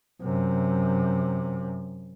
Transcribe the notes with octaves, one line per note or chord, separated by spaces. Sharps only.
F#2 C3